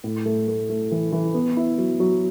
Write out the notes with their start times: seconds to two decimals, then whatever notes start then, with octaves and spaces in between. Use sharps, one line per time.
0.04 A2
0.26 A3
0.48 A3
0.70 A3
0.92 E3
1.12 E3
1.34 B3
1.57 E4
1.78 F#3
2.00 F#3